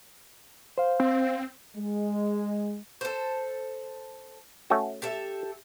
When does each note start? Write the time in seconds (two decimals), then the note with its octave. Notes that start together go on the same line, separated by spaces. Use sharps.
0.78 C5 F5
1.00 C4
1.76 G#3
3.01 A4 C5
4.70 A3 C#4 F#4
5.02 G4 A4 E5